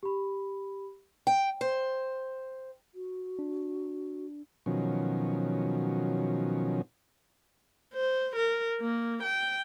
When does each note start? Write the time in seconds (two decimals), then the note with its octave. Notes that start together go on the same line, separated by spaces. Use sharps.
0.03 G4 B5
1.27 G5
1.61 C5
2.94 F#4
3.39 D4
4.66 B2 D#3 F3 F#3 C#4
7.94 C5
8.36 A#4
8.81 A#3
9.23 G5